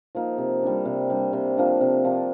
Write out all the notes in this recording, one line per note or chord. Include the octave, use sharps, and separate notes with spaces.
F3 A#3 D#4
C3
G3 D4
C3
G3 D4
C3
F3 A#3 D4
C3
F3 A#3 D4